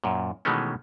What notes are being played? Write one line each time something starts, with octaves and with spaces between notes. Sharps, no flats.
F#2 A#2
B2 D#3 E3 G#3 A3 C#4